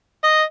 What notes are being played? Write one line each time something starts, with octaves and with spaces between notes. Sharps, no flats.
D#5